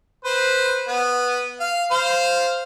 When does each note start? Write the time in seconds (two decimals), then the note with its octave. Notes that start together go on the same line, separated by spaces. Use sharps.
0.25 B4 C5
0.88 B3
1.60 F5
1.91 C5 F5